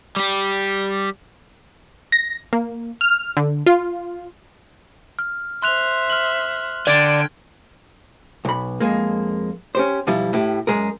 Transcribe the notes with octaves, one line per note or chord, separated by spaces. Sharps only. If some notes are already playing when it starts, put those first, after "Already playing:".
G3 G4
A#6
A#3
F6
D3
F4
F6
C5 E5 C6 F#6 F7
F6 F#7
D3 D5 G5 G#6 D7
B1 B5
F2 G#3 A#3
C#4 G4 C5
B1 F3 G3 E4
A2 E4 G4
F#2 G#3 G#4 A#4